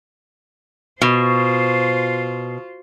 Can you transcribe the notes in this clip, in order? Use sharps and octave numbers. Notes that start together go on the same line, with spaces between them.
B2 F4 C5